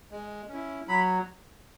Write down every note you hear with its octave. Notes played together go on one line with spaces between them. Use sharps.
G#3
C#4 E4
F#3 B5